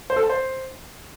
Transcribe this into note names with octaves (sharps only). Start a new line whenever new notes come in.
C5
A4
A5
C5